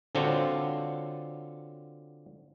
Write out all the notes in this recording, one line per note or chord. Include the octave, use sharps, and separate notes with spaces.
D3 C4 F4 F#4 A4 C#5